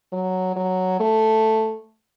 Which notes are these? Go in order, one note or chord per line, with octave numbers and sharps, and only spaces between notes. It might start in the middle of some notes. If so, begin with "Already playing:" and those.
F#3
F#3
A3